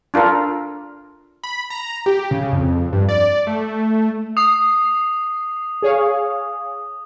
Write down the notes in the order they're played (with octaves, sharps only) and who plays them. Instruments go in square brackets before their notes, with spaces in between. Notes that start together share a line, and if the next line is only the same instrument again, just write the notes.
[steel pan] D4 F4 A4 A#4
[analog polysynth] B5
A#5
G4
C#3
F2
G2
D5
A3
[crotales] D#6 [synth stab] C7
[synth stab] G#4 C#5 F5